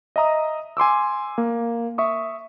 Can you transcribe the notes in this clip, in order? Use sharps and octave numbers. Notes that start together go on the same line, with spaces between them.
D#5 E5 A#5 D#6
G#5 C6 D6 E6
A#3
E5 C#6 D#6